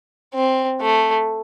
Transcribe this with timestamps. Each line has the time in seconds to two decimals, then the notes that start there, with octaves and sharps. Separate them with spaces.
0.34 C4
0.81 A3